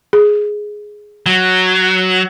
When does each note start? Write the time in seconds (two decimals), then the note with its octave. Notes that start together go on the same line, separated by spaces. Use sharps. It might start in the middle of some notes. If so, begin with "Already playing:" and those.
0.13 G#4
1.26 F#3